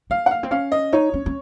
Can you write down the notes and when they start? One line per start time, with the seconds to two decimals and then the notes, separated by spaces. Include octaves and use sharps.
0.10 A#3 F5
0.26 F#5
0.31 F5
0.43 C4
0.51 C#4 F5
0.72 D#5
0.93 D#4 C#5
1.14 C#4
1.26 C#4